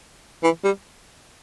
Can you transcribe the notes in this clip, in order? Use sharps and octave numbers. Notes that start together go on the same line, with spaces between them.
E3
G3